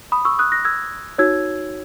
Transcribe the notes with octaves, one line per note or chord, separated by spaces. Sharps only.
B5 D#6
C#6 E6
D#6 F#6
F#6 A#6
E6 G#6
D#4 F#4 C#5 E6 G#6